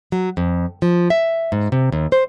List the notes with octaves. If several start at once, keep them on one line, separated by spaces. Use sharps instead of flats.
F#3
F2
F3
E5
G#2
C3
D#2
C5